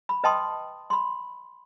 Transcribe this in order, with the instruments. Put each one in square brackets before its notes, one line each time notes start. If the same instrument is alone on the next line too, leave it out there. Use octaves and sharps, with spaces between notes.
[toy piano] B5
B4 D#5 G5 A5 C6 D#6
B5 C6